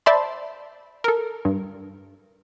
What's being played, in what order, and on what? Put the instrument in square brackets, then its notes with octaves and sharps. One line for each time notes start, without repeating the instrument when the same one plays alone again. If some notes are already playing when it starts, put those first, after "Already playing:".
[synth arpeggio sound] C5 D5 E5 A5 B5 C6
A4 A#4
G2